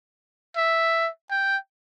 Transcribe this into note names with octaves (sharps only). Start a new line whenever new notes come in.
E5
G5